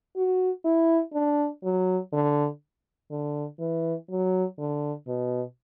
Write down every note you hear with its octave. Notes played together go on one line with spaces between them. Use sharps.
F#4
E4
D4
F#3
D3
D3
E3
F#3
D3
B2